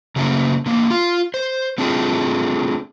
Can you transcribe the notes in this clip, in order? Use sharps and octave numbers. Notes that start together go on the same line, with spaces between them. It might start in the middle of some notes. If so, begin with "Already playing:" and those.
C#3 F#3 G3 A3 A#3 C#4
D3 A#3
F4 F5
C5
A3 C4 D4 F4 G#4